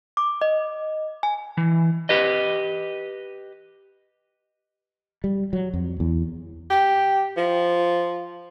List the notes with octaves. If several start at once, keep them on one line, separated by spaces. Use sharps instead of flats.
D6
D#5
G#5
E3
G4 B4 D#5
G3
F#3
F2
E2
G4
F3